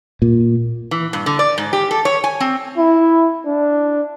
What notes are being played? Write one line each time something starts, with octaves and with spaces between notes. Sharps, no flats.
A#2
E3
G2
D3
D5
G#2
G4
A4
C#5
G#5
C4
E4
D4